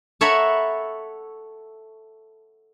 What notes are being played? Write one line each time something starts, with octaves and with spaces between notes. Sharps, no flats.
A4 C#5 E5 F#5 A#5 B5